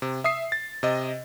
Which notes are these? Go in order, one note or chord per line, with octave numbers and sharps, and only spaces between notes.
C3
E5 D#6 C7
A6
C3 D#5